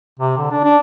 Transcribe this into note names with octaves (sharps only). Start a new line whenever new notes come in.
C3
D3
D4
D4